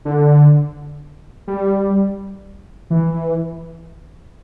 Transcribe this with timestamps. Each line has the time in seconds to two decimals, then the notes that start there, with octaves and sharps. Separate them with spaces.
0.05 D3
1.47 G3
2.90 E3